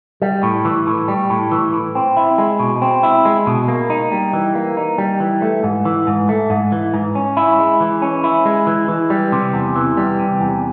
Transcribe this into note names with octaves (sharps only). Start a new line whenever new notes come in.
G3
A2
E3
A2
G3
A2
E3
A2
C4
E4
G#3
B2
C4
E4
G#3
B2
A#3
D#4
G3
E3
A#3
D#4
G3
E3
A3
G#2
E3
G#2
A3
G#2
E3
G#2
C#4
E4
G#3
E3
C#4
E4
G#3
E3
E3
G3
C3
E2
E3
G3
C3
E2